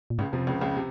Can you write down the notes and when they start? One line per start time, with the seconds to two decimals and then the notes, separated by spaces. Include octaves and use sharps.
0.10 A#2
0.18 C#2 G#2 C#3
0.33 F2 C3 F3
0.47 C#2 C#3
0.61 C#2 C#3
0.75 C3